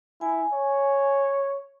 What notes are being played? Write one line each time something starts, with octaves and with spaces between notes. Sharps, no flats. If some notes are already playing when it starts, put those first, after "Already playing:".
E4 G#5
C#5